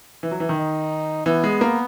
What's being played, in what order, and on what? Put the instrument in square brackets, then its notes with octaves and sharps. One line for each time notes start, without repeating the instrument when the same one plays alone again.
[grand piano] E3
F#3
E3
D#3
[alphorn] D#4
[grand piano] E3 [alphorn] B3
[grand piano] G#3
A#3